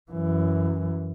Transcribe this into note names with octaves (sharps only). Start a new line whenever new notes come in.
F#2 E3